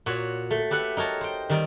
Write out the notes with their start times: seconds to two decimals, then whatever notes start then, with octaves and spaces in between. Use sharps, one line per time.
0.06 A#2 F#4 C#5
0.51 A3
0.71 G4 B4 E5 F#5
0.97 D#4 A#4 C#5 A5
1.21 C5 G5
1.50 D#3 G3 D#4